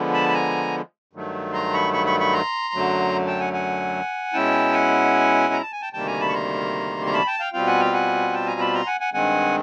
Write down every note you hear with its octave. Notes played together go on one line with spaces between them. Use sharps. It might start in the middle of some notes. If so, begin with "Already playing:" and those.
Already playing: D3 F3 G#3 B3
A5 B5
B5
G#5 A#5
G2 D#3 F#3 A3
A#5 C6
B5 C#6
B5 C#6
B5 C#6
B5 C#6
A#5 C6
F#2 D3 F#3 A3
G5 A5
F#5 G#5
F#5 G#5
B2 G#3 C#4 E4 G5 A5
F#5 G#5
A#5
A5
G#5
G5 A5
D2 C3 D#3 G3 A#3 G5 A5
G#5 A#5
A5 B5
C#6
A#5 C6
A#5
A5 B5
G5 A5
F5 G5
B2 G3 C4 F4 F5 G5
F#5 G#5
F5 G5
F#5 G#5
G5 A5
G#5 A#5
A5 B5
A#5 C6
F#5 G#5
F#5 G#5
G2 D#3 G#3 C4 F#5 G#5